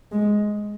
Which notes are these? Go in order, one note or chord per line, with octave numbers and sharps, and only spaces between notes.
G#3